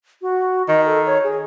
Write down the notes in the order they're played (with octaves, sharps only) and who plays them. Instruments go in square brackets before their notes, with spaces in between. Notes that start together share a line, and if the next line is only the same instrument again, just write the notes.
[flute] F#4
[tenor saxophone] D#3 [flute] D#5
[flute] A4
C#5
G#4